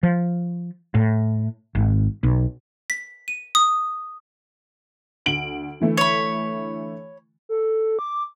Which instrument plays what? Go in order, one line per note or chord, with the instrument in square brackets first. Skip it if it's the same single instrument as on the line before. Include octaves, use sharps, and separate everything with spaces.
[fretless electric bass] F3
A2
G#1
B1
[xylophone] B6
D#7
D#6
[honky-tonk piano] D2 D7 F#7
D3 E3 A3
[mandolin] C#5 B5
[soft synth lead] A4
D6